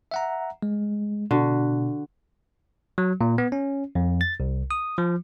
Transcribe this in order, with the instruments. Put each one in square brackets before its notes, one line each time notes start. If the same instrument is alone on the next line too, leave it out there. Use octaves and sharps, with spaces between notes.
[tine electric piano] E5 F#5 A#5
G#3
[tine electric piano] B2 [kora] D3 F#4
[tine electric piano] F#3
A#2
B3
C#4
F2
A6
C2
D#6
F3